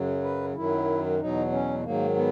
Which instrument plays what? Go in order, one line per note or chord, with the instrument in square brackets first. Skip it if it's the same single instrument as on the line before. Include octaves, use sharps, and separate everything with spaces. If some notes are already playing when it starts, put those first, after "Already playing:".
Already playing: [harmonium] F#2 C#3 F#3
B4
F#2 D#3 F#3 E4
E2 B2 F#3 D#4
C#4
G#2 D#3 F#3 A#3
B3